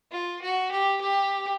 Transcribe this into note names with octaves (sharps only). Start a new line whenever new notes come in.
F4
F#4
G4
G4